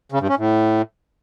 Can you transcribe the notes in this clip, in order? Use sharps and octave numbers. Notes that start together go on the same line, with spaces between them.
C#3
G2
C#4
A2